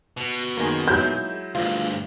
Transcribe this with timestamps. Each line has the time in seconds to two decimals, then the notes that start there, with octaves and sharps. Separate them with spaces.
0.17 B2
0.57 F#2 D#3 A#3 D#4 G#4
0.88 F#3 G#3 E4 G6
1.55 D2 G2 F4